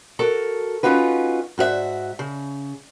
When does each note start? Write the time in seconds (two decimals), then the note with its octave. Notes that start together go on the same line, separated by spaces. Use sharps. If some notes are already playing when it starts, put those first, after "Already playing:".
0.19 F#4 A4 A#4
0.83 C#4 D#4 F4 F#4 B4
1.58 G#2 F#4 C5 E5
2.19 C#3